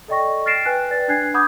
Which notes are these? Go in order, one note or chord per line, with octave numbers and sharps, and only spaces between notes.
A4 D5 D#5 G5 C#6 A#6
F6 A6 A#6 C7 D7 E7
B4 G5 G#5 F#6
B4 D5 A6
D4 G#5 F#6 G#6 C7
F#5 B5 D6 D#6 G6 G#6